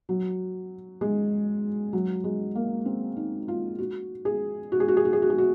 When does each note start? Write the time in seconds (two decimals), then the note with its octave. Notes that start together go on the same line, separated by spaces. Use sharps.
0.09 F#3
1.01 G#3
1.93 F#3
2.24 G#3
2.55 A#3
2.86 C4
3.16 D#4
3.48 F4
3.79 F#4
4.25 G#4
4.72 F#4
4.80 G#4
4.88 F#4
4.97 G#4
5.05 F#4
5.13 G#4
5.22 F#4
5.30 G#4
5.38 F#4